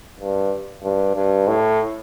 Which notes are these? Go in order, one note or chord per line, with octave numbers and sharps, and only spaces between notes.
G2
G2
G2
A2